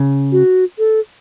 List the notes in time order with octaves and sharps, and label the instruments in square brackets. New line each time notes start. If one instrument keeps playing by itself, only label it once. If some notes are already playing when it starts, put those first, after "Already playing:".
Already playing: [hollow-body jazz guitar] C#3
[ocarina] F#4
A4